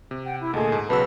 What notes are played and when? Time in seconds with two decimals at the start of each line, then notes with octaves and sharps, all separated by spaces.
0.11 C3
0.25 F#5 G5
0.38 E4
0.54 D2 A#2 G#4 A4 D#5 A5
0.72 G#2
0.90 B1 C#3 F#4 B4 A5 B5 E6